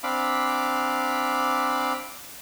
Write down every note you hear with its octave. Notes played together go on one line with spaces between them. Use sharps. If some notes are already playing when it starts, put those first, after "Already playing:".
C4 D4 F5 B5 D6